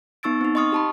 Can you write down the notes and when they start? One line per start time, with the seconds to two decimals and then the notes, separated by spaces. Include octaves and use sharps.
0.23 B3 D#4 C#6 E6 A6 D7
0.41 C4 D#4
0.55 D#5 C6 C#6 D#6 F6
0.72 G4 A5 B5